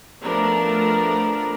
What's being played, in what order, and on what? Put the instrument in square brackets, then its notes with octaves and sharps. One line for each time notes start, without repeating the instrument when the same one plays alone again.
[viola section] F3 A3 B3 D4 A#4 D5